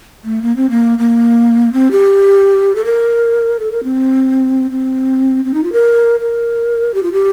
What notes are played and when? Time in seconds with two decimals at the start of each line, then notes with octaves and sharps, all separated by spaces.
0.24 A3
0.42 A#3
0.56 C4
0.70 A#3
0.99 A#3
1.73 C4
1.91 G4
2.75 A4
2.85 A#4
3.60 A4
3.72 A#4
3.84 C4
4.71 C4
5.45 C4
5.54 D#4
5.64 F4
5.73 A#4
6.20 A#4
6.94 G4
7.03 F4
7.12 G4